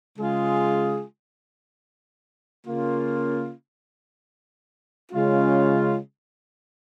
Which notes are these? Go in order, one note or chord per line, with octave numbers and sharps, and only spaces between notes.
C#3 G#3 F4 G#4
C#3 A#3 C#4 F4
C#3 G#3 C#4 F4